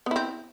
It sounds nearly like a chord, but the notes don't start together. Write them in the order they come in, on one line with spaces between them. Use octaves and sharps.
B3 E4 C4